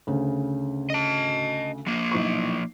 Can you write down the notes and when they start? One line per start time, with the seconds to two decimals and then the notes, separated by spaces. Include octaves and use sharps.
0.07 D2 C#3
0.90 D#5 A5
1.87 F3 A#3 C7
2.12 B1 E4 C#6